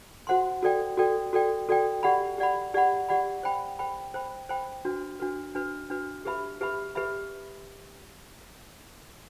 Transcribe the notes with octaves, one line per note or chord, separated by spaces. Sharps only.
F#4 C5 F#5 C6
F#4 A4 D5 G5
F#4 A4 D5 G5
F#4 A4 D5 G5
F#4 A4 D5 G5
G4 D5 F#5 B5
G4 D5 F#5 B5
G4 D5 F#5 B5
G4 D5 F#5 B5
C5 G5 B5
C5 G5 B5
C5 G5 B5
C5 G5 B5
D4 F#4 B4
D4 F#4 B4
D4 F#4 B4
D4 F#4 B4
G4 B4 E5 B5
G4 B4 E5 B5
G4 B4 E5 B5